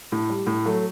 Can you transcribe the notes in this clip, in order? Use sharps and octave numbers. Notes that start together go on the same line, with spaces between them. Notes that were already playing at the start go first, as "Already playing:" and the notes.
A2
G3
A2
F#3 A3